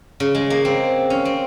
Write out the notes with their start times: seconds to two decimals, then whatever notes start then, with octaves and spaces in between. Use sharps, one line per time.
0.20 C#3
0.35 G#3
0.50 A#3
0.65 C4
1.10 C#4
1.25 C4